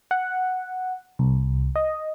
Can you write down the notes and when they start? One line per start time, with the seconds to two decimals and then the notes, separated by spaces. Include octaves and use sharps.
0.11 F#5
1.19 C2
1.76 D#5